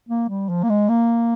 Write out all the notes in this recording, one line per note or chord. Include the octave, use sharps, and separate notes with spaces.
A#3
G3
F3
A#3
G#3
A#3